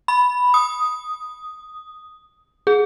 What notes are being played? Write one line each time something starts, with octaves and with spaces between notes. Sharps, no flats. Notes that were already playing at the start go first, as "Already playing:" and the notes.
B5
D#6
G#4